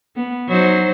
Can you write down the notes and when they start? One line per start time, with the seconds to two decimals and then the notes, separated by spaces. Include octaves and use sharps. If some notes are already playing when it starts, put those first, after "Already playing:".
0.16 B3
0.49 F#3 D#4 C5